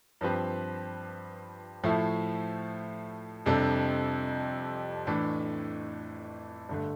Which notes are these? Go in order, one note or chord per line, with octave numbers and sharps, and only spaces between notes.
G2 F3 C4 G4 B4
A2 F3 A3 E4
F2 C3 G3 D4 A4
A2 E3 A3 D4 A4
G2 D3 A3